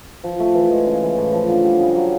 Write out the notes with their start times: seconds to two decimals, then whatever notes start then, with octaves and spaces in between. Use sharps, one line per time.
0.24 F3
0.40 A3
0.55 E3
0.71 G#3
0.86 C#3
1.02 E3
1.17 A2
1.33 F3
1.49 D3
1.64 G3
1.80 C#3
1.95 F#3